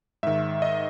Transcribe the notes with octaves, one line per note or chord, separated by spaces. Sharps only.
G#2 D#3 E5
D#5